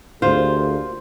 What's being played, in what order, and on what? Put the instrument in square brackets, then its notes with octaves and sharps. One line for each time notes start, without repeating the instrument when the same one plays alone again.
[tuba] D2 [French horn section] A#3 G4 G#4 [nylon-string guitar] F4 [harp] C5